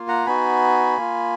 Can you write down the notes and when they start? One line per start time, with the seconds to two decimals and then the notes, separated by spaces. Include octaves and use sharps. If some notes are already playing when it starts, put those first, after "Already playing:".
Already playing: A#3 F4
0.08 F#5 A#5
0.26 B3 D#4 F#4 G#5 B5
0.97 A#3 F4